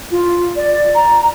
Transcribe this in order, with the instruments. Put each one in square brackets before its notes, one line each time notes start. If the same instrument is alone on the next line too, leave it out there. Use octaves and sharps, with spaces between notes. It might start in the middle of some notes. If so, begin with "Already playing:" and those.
[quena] F4
D5
A#5